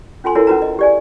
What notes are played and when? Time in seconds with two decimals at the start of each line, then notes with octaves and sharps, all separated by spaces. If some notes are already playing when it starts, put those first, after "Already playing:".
0.24 C#4 F4 A4 G#5 C6
0.35 E4 F#4 A4 A#4 C#5
0.47 C#4 D#4 F#4 B4 A#5
0.62 D#5
0.79 G4 D5 G#5